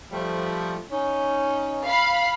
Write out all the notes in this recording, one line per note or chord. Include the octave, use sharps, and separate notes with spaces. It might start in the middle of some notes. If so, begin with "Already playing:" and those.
F3 G3 A3
C#4 D#4
F5 B5